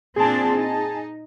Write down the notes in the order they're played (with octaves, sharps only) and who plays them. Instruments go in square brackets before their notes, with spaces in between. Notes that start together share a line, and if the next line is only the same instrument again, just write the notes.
[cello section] A#2 C4 D4 [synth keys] G#4 A5
[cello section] D#4